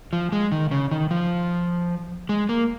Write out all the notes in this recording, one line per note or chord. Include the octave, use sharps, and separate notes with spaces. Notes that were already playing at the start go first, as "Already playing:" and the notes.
F3
G#3
D#3
C#3
D#3
F3
G#3
A#3